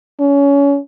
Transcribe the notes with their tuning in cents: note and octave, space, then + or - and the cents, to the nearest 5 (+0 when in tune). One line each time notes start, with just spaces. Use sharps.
C#4 +25